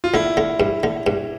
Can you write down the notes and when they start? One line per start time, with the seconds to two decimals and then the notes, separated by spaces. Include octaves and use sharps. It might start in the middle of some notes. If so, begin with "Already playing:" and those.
0.04 F4
0.14 D3 E4
0.37 D3
0.60 G2
0.83 D3
1.07 G2